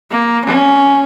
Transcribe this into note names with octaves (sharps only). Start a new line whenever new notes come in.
A#3
C#4